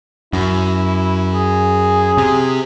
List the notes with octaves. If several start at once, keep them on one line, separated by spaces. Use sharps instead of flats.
F#2 E4
G#4
C3